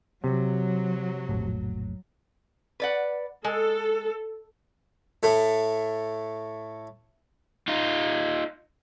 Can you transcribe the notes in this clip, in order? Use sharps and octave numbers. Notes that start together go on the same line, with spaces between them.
C3 F#3
F1 A#1 A2
B4 D5 F#5
G#3 A4
A2 A3
D#4 F4